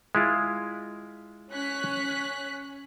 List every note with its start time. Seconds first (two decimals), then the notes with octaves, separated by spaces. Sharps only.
0.15 G#3 E4 F4
1.50 C#4 F#6 B6